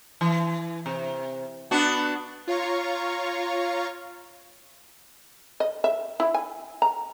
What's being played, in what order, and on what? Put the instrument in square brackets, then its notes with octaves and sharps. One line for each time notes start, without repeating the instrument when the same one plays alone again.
[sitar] E3
C3
B3 D4 F#4
[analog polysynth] F4 C#5 F5 A#5 C#6
[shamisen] D#5
E5
E4
G#5
A#5